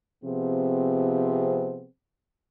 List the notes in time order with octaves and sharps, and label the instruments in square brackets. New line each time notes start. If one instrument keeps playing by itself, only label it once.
[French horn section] C3 F3 B3 C4 G#4